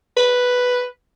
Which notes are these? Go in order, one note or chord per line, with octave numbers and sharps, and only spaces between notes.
B4